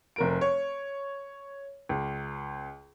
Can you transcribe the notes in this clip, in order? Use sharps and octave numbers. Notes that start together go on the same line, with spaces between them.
F1 A#4 D7
C#5
C#2